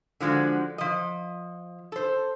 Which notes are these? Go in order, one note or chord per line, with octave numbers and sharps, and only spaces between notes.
D3 F3 G#3 F#4
F3 D#5
A4 C5